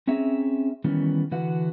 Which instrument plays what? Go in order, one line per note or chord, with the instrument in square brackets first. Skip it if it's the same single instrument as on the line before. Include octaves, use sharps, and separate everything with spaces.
[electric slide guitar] C4 C#4 G#4 E5 A#5
D#3 E3 G3 B3 C#4
D3 E3 F#4 B4 F#5